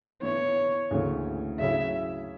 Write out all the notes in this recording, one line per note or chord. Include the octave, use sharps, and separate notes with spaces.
E3 B3 E4 C#5
D2 C#3 E3 A#3 C#4
C#3 F#3 C#4 E4 E5